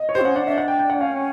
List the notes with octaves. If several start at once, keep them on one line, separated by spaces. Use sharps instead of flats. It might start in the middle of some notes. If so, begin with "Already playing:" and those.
Already playing: D#5
C#5
G4 C5
C4
C#4 F#5
D4 F#5
D4 E5
F#5
G5
G5
F#5
C#4 F5